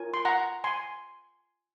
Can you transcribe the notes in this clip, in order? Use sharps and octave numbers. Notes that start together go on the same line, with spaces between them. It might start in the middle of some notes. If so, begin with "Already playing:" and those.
Already playing: F4 A#4 C#5 G#5
C6
F#5 A#5
G#5 C6